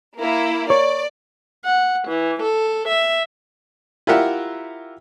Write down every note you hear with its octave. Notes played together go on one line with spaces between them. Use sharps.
A#3 E4
C#5 D5
F#5
E3
A4
E5
E4 F4 G4 A#4 E5 F#5